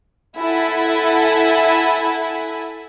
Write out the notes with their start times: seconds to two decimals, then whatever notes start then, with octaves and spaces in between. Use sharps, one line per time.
0.37 E4 A4 E5 F#5 G#5 B5